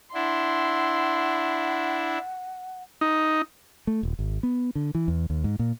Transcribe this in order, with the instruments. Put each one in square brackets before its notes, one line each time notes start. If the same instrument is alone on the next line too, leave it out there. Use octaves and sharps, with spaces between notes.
[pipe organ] D4 E4 [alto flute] F#5 [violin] C6
[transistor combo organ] D#4
[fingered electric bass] A3
D#1
G#1
B3
D3
E3
E2
D#2
G#2
A#2